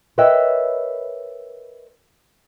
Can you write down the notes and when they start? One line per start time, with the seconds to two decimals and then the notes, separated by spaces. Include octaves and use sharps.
0.18 A#4 B4 C#5 D#5 E5 G5